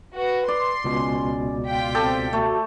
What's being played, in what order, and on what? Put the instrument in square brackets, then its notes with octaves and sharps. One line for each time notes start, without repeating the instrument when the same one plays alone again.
[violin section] F#4 [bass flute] B4
[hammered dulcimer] D5 [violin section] C6
[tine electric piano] C#2 B2 [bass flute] C#4
[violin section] F4 G5 B6
[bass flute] C4 [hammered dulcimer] G4 A4
[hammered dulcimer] A3 [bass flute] F#4